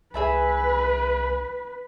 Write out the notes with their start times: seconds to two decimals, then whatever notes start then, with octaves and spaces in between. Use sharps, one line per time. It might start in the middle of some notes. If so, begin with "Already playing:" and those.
0.14 C2 G#4 B4 E5 B5